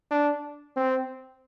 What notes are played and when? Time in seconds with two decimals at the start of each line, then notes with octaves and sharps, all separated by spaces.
0.11 D4
0.76 C4